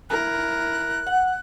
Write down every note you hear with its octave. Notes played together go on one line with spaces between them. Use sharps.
E4 A#4 F#6
F#5